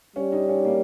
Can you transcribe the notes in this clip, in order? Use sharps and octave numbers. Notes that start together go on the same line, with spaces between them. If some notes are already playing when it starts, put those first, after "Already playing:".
G3 C#4
D#4
C#4
A#3